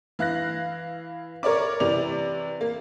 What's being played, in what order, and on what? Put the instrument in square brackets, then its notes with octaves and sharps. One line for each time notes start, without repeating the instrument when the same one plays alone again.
[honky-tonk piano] E3 F5 F#6 A#6
A#4 C#5 D5 D6
C3 E3 D5 F7
A#3